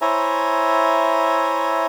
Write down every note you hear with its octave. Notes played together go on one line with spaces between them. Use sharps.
E4 C5 C#5 E5 G#5 A#5